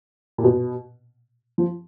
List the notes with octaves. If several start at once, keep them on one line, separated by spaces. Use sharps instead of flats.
A#2
B2
F3